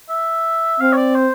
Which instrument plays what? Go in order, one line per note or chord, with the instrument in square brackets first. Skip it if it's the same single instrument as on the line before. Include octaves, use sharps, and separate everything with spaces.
[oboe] E5
[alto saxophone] C4 [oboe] F5
[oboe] C#5
D5
C5